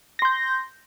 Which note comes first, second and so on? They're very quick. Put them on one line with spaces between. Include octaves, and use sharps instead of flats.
A#6 C6 G6